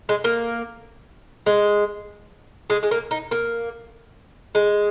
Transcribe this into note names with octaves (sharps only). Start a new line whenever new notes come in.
G#3
A#3
G#3
G#3
G#3
A#3
D#4
A#3
G#3